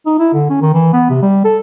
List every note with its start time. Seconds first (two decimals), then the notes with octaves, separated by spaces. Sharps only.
0.06 D#4
0.19 E4
0.34 D3
0.50 C#4
0.62 D#3
0.74 E3
0.93 B3
1.10 C3
1.22 G3
1.45 A4